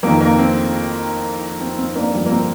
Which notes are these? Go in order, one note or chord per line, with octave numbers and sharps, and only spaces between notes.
F2 D#3 A#3
A#3
C4
C4
C4
A#3 D4
G2 D3 F3
A#3
C4